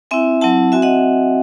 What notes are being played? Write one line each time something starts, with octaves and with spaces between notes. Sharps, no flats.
C4 E4 E5 G#5
F#3 C4 E4 F#5 A5
C4 F#4 E5 G#5
D#5 F#5